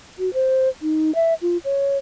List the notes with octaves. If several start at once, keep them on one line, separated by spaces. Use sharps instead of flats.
F#4
C5
D#4
E5
F4
C#5